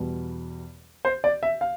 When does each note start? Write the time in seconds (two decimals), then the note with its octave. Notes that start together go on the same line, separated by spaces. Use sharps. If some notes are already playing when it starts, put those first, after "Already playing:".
Already playing: E2 B2 G3
1.05 C5
1.24 D5
1.43 E5
1.61 F5